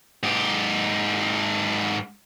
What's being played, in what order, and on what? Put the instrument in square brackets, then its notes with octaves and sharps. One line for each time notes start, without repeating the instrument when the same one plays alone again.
[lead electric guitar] G#2 G4